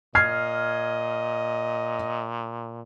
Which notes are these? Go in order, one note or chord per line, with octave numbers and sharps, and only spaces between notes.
A#2 D#5 F6 G#6 C7